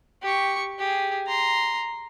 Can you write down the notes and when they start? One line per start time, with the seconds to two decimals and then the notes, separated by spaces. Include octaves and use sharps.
0.22 G4 C#6
0.79 G4 G#4
1.27 A#5 C6